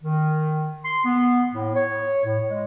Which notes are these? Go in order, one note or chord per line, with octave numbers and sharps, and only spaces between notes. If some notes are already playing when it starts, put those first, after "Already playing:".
D#3
C6
B3
A2
C#5
A2
G#3